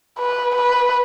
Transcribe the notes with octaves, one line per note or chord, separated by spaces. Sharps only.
B4
B4